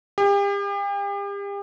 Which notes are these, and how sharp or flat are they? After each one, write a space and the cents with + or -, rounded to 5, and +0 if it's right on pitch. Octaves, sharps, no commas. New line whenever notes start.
G4 +40